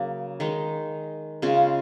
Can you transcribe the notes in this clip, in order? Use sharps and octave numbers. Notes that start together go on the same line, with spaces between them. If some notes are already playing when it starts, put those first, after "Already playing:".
Already playing: C#3 F#3 A#3
D#3 G#3 D#4
C#3 G#3 C#4 F4